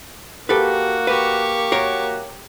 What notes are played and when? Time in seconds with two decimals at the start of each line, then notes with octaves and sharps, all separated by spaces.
0.49 A#3 F#4 G4 A4 B4
1.07 G4 B4 C#6
1.72 F#4 A#4 C#5